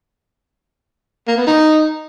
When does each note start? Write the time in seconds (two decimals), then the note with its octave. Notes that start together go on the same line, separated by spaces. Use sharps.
1.28 A#3
1.37 B3
1.47 D#4